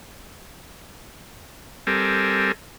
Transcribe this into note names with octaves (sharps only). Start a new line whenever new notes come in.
G3 C4 A4 A#4 G#5